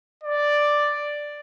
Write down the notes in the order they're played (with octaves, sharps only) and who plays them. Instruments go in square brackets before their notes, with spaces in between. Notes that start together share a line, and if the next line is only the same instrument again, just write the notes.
[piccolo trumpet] D5